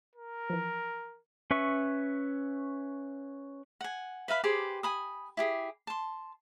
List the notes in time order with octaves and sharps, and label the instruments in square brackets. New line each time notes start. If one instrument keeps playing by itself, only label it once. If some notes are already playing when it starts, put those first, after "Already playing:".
[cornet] A#4
[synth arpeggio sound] E3 F3
[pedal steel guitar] C#4 B4 E5 C#6
[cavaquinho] F#5 G#5
B4 E5 F5 B5
G4 G#4 B4 C5
G#5 B5 D#6
E4 G4 G#4
A5 C6